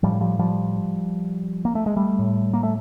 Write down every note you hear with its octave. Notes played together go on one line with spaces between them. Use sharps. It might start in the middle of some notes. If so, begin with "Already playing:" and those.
A2 F3 G3
F3 G3
F3 G3
A#3
A3
G#3
G3 A3
A2
A#3
A3